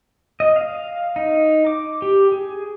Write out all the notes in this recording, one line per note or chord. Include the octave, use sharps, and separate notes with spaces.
D#5
F5
D#4
D6
G4
G#4